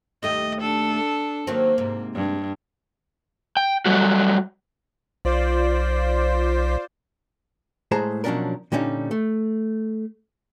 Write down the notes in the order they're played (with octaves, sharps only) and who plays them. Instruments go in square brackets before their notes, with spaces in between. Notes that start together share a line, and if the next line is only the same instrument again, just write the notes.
[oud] D#2 A3 G4 [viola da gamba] D#5
[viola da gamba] D4 A4
[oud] D#3 F#3 C4 [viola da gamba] A#3
[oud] G#2 C3
[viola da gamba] G2
[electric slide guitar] G5
F#3 G3 A3 F#4
[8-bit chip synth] B1 [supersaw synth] F4 C5 D5
[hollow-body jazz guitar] A2 G#3 G#4 C5 A5 A#5
B2 F3 F#3 C#4 D4 A#4
A#2 D3 G3 C#4 D#4
A3